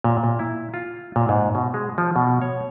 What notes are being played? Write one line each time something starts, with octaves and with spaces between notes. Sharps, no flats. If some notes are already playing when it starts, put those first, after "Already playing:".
A#2
A#2
E4
F4
A#2
G#2
B2
G#3
F3
B2
C#5